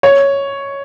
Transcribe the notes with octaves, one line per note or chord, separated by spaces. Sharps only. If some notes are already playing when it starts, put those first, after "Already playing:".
C#5